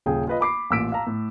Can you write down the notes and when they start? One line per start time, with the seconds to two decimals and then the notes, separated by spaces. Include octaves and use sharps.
0.06 D#1 C#3 G#4 G5
0.28 F4 B4 D#5
0.41 B5 D6 C7
0.71 A1 A#2 E6 B6 D7
0.92 F5 A5 A#5
1.07 A2